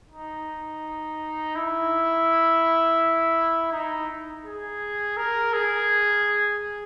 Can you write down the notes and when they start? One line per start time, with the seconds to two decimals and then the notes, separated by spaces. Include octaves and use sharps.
0.10 D#4
1.55 E4
3.72 D#4
4.44 G#4
5.17 A#4
5.53 G#4